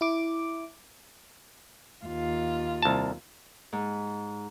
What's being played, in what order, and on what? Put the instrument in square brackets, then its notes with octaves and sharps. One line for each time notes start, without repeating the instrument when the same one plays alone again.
[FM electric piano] E4 D6
[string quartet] D#2 F4
[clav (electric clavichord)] C2 A5
[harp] G#2